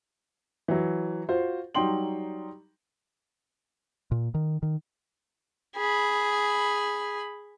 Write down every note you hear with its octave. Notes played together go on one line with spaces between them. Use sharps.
E3 F#3
F4 F#4 C5
F#3 G3 D#4 G5 C6 F#7
A#2
D#3
D#3
G#4 B5